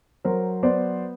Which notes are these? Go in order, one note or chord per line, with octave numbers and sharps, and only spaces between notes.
F#3 A#4 C5
B3 C5 D5